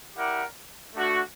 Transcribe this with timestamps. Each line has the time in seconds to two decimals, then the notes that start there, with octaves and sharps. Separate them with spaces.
0.16 E4 G4 A#4 D5 F#5
0.94 A3 D4 F#4